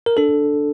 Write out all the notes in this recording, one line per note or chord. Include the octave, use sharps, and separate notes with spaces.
A#4
D4 A4